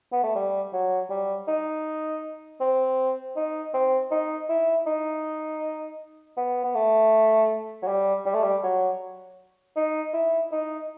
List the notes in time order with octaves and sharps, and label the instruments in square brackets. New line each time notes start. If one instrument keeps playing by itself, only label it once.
[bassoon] B3
A3
G3
F#3
G3
D#4
C4
D#4
C4
D#4
E4
D#4
B3
B3
A3
F#3
G3
G3
A3
G3
F#3
D#4
E4
D#4